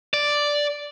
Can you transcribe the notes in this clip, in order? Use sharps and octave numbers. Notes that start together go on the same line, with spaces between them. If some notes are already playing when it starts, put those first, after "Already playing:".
D5